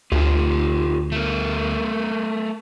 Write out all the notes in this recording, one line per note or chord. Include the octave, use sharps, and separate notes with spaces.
D2 F4 G4 A4
A3 A#4